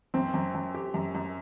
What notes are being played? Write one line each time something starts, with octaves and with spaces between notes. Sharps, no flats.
F#2 C4
F#2
F#2
G4
F#2
F#2